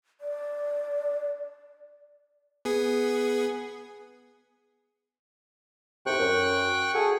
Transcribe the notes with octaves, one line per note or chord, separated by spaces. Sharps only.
D5
B3 G#4
D#2 A2 C3 G5 C#6 F#6
F#2
F#4 G#4 A4